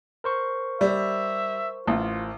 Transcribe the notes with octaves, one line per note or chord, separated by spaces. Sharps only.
A#4 C5 C#6
G3 E5
A1 F4